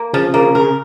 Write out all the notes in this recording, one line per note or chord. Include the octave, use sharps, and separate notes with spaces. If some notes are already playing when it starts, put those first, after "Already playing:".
Already playing: A#3
C#3 F3
C#3 A#3
C#3 A#4